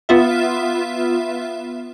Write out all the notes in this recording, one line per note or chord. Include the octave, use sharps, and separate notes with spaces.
B3 F4 E5